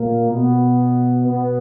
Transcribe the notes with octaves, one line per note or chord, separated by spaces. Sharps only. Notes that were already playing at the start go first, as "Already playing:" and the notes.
Already playing: A#2 A#3
B2 B3
B2 B3